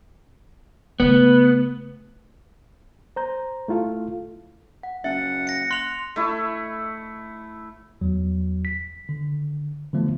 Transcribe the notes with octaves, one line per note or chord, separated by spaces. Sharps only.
C#3 A3 B3
C5 A#5 G6
A3 E4 F4 A4 F5
F#5
F#1 E5 F#5
A#6 C#7
C6 F#6 F7
A3 E4
E2 F#3
B6
D3
D3 E3 F3 A3 B3